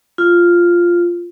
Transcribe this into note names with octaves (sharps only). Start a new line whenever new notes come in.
F4